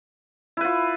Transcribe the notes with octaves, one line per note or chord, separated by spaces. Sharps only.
E4 F4 B4